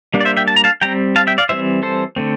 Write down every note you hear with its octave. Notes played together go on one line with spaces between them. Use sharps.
G3 A#3 D4
D5
C5 E5
E5 G5
A5
A#5
F5 A5
G3 C4 G5 A#5
F5 A5
E5 G5
D5 F5
E3 G3 C4 C5 E5
A4 C5
D3 A3 C4